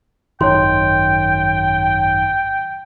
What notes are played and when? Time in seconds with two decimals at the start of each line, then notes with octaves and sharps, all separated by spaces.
0.41 G#1 F#2 D#3 C#5 G5 C6